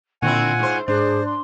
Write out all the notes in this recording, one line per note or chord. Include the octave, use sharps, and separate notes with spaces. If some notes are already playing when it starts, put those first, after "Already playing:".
A#2 D3 C4 E4 F4 F#5 G#5
G#2 C5
G#2 D4 G#4 C5
C6